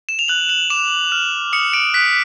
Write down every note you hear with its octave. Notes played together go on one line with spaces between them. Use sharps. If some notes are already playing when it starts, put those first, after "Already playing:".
E7
F7
F#6 F#7
F#7
D6 E7
F6
D#6 C#7
D7
F#6 B6